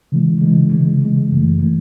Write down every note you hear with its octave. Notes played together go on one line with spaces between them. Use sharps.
C#3 E3 G#3
C#3 E3 G#3
C#3 E3 G#3
C#3 E3 G#3
F#2 E3 A3
E3 A3